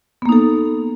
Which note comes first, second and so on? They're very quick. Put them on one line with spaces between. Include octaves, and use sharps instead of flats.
B3 A#3 D#4 A4